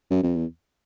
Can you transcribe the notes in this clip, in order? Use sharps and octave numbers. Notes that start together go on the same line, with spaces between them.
F#2
F2
E2